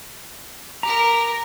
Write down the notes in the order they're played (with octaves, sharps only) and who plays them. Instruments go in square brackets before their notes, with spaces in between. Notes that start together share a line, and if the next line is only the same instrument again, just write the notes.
[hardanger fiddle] G4 A#4 [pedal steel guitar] A#5